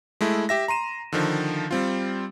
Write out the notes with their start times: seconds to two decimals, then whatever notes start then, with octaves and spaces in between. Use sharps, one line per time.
0.21 G#3 A3 E4
0.49 G4 E5 A#6
0.68 A#5 C6 D#7 E7
1.12 D3 D#3 F3
1.71 G3 C4 F4